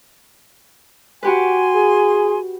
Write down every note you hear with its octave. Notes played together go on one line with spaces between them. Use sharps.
F#4 G4 B4 G#5 C6
G#4